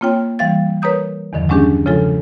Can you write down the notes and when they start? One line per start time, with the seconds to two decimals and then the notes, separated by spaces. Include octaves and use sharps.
0.01 A#3 C4 F4 C#5 G5
0.39 E3 G3 F5 A6
0.82 A#4 B4 C#5 A#5 D#6 G6
1.33 E2 G2 D3 D#3 F3
1.49 F#3 G#3 C#4 D4 G4 G#4
1.86 C#3 F3 G#3 F4 A4